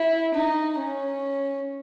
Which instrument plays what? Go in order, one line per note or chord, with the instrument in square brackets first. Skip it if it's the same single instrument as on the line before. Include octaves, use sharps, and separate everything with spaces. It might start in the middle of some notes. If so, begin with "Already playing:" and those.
Already playing: [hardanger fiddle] E4
D#4
C#4